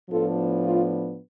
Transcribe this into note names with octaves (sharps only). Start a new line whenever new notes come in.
A2 F3 B3 D4 F4 A4
F4